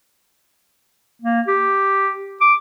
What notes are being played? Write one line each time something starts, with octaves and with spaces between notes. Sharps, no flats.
A#3
G4
D6